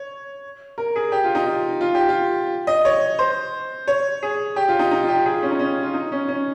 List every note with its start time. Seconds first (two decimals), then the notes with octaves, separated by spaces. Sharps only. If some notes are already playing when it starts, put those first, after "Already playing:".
Already playing: C#5
0.78 A#4
0.96 G#4
1.12 G4
1.24 F4
1.35 D#4
1.46 F4
1.81 F4
1.95 G4
2.09 F4
2.67 D#5
2.85 C#5
3.19 C5
3.88 C#5
4.23 G#4
4.56 G4
4.69 F4
4.79 D#4
4.91 D#4
5.03 F4
5.09 G4
5.26 G#4
5.33 F4
5.42 C#4
5.51 D#4
5.59 C#4
5.83 F4
5.94 D#4
6.12 C#4
6.29 C#4